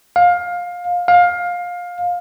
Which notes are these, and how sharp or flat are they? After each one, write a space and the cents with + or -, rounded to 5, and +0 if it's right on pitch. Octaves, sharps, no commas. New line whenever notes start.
F5 +20
F5 +20